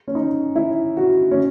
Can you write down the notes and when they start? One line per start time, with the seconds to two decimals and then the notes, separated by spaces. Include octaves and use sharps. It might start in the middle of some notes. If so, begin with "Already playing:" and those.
0.08 C#4
0.15 D#4
0.56 E4
0.97 F#4
1.31 C#4